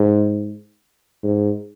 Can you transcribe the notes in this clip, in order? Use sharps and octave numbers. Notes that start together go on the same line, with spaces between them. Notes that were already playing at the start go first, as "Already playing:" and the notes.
Already playing: G#2
G#2